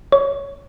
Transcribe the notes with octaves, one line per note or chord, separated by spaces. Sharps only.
C#5